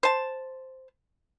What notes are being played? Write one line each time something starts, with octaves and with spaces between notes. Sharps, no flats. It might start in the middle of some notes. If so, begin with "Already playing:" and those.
C5 A5